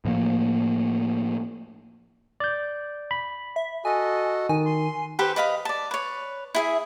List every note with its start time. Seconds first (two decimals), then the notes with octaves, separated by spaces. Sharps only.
0.05 A2 F3 A#3
2.40 D5 G6
3.11 B5
3.56 E5
3.85 F#4 A4 D#5 G#5
4.49 D#3 G#5
4.66 C6
5.19 G4 A4 B4 C5
5.36 B4 D#5 F5 B5
5.65 D5 A5
5.91 B4 C#5
6.55 E4 G#4 E5